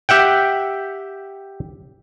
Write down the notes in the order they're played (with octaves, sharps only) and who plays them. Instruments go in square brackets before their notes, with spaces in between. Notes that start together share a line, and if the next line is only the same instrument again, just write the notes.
[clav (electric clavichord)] G4 E5 F#5 G5